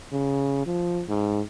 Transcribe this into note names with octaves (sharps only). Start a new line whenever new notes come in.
C#3
F3
G#2